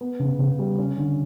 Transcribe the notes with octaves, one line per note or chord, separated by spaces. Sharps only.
B3
C#3
C#3
G3
C#4
D3